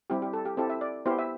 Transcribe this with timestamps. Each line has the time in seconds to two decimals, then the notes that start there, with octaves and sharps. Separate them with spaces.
0.10 G3 C4 E4 G4
0.22 G4
0.33 A4
0.45 G4
0.57 C4 E4 G4 A4
0.70 E5
0.81 D5
1.06 B3 E4 G4 C5
1.19 E5